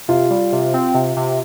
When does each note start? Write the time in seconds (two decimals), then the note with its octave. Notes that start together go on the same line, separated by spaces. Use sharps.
0.08 C3 F4
0.30 G3
0.52 C3
0.74 C4
0.94 C3
1.16 C3